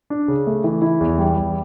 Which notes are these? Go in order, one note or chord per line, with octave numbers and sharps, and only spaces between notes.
D4
C#3
A3
E3
E4
E2
G3
E2